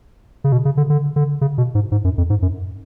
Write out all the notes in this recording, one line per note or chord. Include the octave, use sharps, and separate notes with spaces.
C#3
B2
C#3
D3
D3
D3
C#3
B2
G#2
G#2
F#2
F2
G#2
F#2